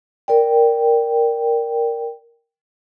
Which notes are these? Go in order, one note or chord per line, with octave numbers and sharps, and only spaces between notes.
A#4 D5 G5